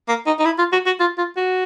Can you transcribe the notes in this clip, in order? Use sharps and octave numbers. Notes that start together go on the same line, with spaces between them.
A#3
D#4
D#4
E4
F4
F#4
F#4
F4
F4
F#4